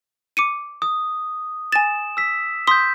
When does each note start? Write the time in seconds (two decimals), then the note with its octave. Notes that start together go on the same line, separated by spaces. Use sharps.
0.37 D6 C#7 D#7
0.82 D#6
1.72 G#5 A6 E7
2.17 E6 B6
2.67 C6 D#6 G6 B6